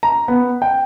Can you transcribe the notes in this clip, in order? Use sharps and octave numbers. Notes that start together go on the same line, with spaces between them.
A#5
B3
G5